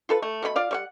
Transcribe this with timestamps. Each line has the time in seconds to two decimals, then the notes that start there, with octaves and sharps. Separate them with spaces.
0.09 F4 A4 B4
0.22 A3
0.42 B2 A3 C#4 B5
0.56 F4 D5 F5
0.71 G3 C#5 F#5